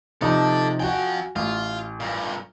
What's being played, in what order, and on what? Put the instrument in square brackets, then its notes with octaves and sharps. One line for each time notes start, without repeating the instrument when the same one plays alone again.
[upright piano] C3 F3 D#4 [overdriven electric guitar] A4 D5
[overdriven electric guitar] F3 G5 [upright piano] F#4 G#5
[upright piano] A1 [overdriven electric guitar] F4
[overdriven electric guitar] G2 A#2